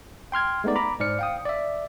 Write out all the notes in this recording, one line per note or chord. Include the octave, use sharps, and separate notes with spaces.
G5 C6 F6 G#6
G#3 A3 B3 D#4 D5
A#5 B5 D6
G#2 C5 D5 F6 C#7
F5 G5 D#6
D5 E5